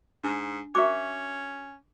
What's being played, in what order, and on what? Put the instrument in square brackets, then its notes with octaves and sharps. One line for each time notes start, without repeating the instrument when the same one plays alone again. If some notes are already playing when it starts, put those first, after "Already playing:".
[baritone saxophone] G#2 [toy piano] D4
[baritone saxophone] C#4 [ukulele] F#4 A#4 E5 [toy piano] C#6 D6